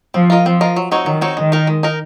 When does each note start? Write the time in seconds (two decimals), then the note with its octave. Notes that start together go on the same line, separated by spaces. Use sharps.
0.14 F3 C4
0.30 F4 A#4 D#5
0.46 F3 C4
0.61 F4 A#4 D#5
0.76 F#3
0.91 C4 D#4 F#4 C#5
1.06 D#3 F#3
1.21 C4 D#4 F#4 C#5
1.37 D#3 G#3
1.52 D#4 A#4
1.67 G#3
1.83 D#4 A#4